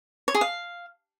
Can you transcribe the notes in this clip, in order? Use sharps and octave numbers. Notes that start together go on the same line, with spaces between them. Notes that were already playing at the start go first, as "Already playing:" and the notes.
C#5
G#4
F5